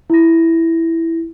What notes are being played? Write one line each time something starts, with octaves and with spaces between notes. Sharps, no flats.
E4 A#6